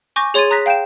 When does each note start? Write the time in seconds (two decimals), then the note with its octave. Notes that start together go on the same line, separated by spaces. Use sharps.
0.16 G#5 C#6 D6 G6 A#6
0.34 G#4 C#5 C6 G#6 A6 D#7
0.51 A#5 D#6 F#6 A#6 B6
0.66 F5 G5 G6 D7 E7